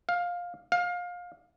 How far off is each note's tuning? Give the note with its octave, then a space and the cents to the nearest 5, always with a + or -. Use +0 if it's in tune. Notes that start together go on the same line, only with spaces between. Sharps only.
F5 +15
F5 +25